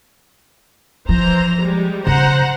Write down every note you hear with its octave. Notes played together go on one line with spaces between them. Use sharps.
E3 F3 C5 A#5
G3 G#3
C#3 C5 F#5 A#5